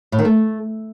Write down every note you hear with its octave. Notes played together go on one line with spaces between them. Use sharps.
A2
D#3
A3